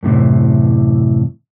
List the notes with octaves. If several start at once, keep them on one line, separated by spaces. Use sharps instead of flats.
F#2 A2 C3 E3